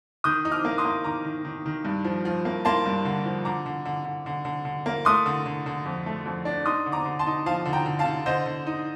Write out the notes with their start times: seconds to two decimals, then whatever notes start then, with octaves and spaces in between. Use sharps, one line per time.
0.24 D#3 D#6 G6
0.45 D#4
0.52 D6 F6
0.65 A#3
0.78 C6 D#6
0.85 A#3
1.04 D#3 A#5 D6
1.24 D#3
1.45 D#3
1.66 D#3
1.85 G2
2.04 F3
2.25 F3
2.45 A#3
2.65 A#3 A5 C6
2.86 G2
3.05 D3
3.25 F3
3.45 D3 A#5 D6
3.66 D3
3.85 D3
4.05 D3
4.26 D3
4.45 D3
4.65 D3
4.86 A#3
5.05 A3 C6 D#6
5.26 D3
5.46 D3
5.66 D3
5.86 F2
6.06 A3
6.26 F2
6.45 D4
6.66 D#4 C6 D#6
6.86 D3
6.92 A#5 D6
7.05 D3
7.19 A5 C6
7.27 D#4
7.46 F3 F5 A5
7.66 D3
7.73 G5 A#5
7.86 D3
7.99 F5 A5
8.06 D3
8.26 D3 C5 D#5
8.46 D3
8.67 D#4